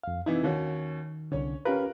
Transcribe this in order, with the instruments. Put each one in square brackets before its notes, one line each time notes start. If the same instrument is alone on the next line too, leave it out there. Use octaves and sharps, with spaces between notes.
[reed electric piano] F2 F5
[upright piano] C3 E3 E4 [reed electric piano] D#4
[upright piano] D#2 C#4 F#4 [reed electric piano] D#3
[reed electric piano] C2 D3 [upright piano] C#4 C#5
[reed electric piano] C#4 G4 B4 [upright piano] F4 A#4 F#6